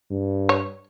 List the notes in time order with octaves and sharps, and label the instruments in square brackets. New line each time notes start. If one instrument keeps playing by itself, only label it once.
[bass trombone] G2
[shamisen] C#5